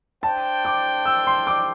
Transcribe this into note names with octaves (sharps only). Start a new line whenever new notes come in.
D4 C5 G5 A5
D6
E6
C6
D6